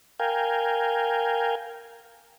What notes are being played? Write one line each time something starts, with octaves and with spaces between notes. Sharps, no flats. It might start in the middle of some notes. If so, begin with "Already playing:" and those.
A#4 F5 G5 G#5